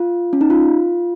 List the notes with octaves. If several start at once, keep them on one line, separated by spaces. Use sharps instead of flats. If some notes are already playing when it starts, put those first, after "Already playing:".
Already playing: F4
C#4
D#4
F4